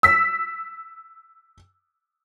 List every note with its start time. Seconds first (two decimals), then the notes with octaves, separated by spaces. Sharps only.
0.03 E6 B6